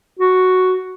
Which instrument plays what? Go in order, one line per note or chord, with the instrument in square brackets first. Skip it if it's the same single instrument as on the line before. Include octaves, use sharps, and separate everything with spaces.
[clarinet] F#4